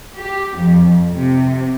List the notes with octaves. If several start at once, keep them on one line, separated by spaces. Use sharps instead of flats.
G4
F2
C3